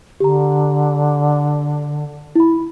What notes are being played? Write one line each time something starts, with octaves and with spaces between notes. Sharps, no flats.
D3 G4 A#5
E4 B5